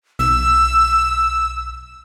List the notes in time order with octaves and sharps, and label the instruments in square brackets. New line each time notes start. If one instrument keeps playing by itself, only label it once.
[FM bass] B1 [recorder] E6